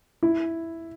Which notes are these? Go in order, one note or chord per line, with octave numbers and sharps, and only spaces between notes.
E4